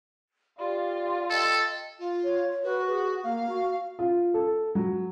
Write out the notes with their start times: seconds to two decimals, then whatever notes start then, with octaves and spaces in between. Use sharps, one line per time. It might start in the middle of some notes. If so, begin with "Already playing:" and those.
0.58 F4 G4 D5 F5
1.30 A4 D#5 G5
1.99 F4
2.24 C#5
2.64 F#4 B4
2.88 G#4
3.24 A#3 F5
3.49 F#4
3.99 F4
4.34 A4
4.75 F#3